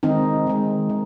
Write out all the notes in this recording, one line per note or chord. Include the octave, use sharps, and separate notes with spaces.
D#3 G#3 C4 D#4
D#3 G#3
D#3